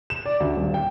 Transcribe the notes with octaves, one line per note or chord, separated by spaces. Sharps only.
E7
D5
D2
D#1
G5